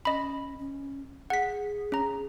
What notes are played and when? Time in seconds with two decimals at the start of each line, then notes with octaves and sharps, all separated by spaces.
0.05 C#4 D#5 B5
0.59 C#4
1.30 G#4 F#5 B6
1.92 C#4 A#5